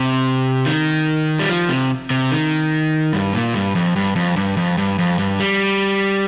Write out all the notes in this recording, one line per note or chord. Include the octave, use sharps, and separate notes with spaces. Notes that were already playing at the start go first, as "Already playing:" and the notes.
Already playing: C3
D#3
G3
F3
C3
C3
D#3
G2
A#2
G2
F2
G2
F2
G2
F2
G2
F2
G2
G3